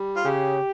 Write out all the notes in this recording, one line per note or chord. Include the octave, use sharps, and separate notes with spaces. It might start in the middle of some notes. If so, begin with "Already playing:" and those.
Already playing: G3
F4
C#3 G4